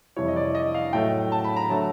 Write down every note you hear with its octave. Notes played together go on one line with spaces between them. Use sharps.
F2 C3 E3 G3 C#5
D#5
D5
D#5
F5
A2 F#3 A3 G5
A5
B5
A#5
D3 F#3 A3 A5